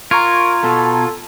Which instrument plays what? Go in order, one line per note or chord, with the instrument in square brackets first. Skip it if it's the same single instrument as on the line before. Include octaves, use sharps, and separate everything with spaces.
[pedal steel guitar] F4 [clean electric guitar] A#4 [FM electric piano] A#5 C#6 G#6
[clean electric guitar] B2 [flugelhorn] A4